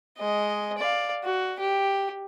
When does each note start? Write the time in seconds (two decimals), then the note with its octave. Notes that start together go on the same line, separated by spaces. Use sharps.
0.18 G#3 D#5
0.78 D5 F5
1.24 F#4
1.59 G4